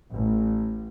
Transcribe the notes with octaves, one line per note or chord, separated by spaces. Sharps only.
A1